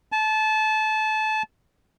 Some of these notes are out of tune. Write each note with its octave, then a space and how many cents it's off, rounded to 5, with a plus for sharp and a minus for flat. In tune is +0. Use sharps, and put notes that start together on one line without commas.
A5 -25